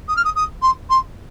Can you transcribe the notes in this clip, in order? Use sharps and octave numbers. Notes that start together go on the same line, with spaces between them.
D#6
F6
D#6
D#6
C6
C6